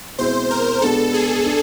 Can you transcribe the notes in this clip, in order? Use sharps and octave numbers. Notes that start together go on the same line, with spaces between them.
B2 G#3 C4 E4 C5
A#4
B2 G#3 B3 D4 A4
G#4
D4